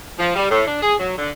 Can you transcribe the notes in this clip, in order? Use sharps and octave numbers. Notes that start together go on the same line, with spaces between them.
F3
G3
A2
D4
G#4
F#3
D3